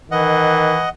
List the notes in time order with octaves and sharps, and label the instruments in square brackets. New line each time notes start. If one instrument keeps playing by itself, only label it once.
[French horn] D#3 [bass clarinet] E3 [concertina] D#5 F#5